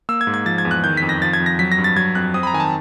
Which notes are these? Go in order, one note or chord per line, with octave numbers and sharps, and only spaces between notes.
A#3 E6
G#6
G#2
G#6
F3 A6
G#6
E2
F#6
D#3 G6
F2 B6
A#6
F3 A6
G#6
F2
A#6
F#3 B6
A#6
G2
A6
F#3 G#6
F2 F#6
C4 D#6
B5
A#5
D#3 G#5
A5